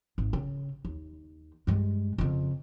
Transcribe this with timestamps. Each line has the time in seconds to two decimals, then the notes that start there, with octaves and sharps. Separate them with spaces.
0.18 G#1
0.33 C#3
0.85 D#2
1.67 G2 G#3
2.18 F2 C#3